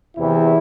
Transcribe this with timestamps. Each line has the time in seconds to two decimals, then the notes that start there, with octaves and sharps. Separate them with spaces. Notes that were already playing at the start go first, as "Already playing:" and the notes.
0.17 E2 C3 E3 E4